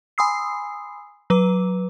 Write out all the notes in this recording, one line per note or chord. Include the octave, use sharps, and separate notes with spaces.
G#5 B5 C6 D#6 E6 C7
F#3 B4 D6